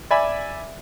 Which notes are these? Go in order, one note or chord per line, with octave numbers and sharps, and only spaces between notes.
D5 E5 G#5 B5